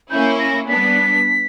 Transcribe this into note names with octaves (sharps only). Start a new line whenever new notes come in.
A#3 C#4 E4 G6
A#6
G3 B3 D4 B6